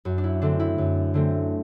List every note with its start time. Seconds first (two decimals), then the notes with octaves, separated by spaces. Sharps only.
0.05 F#2 F#4
0.18 D4
0.24 E4
0.42 D3 A3 C4 D4
0.60 E4
0.78 F#2
1.14 D3 A3 C4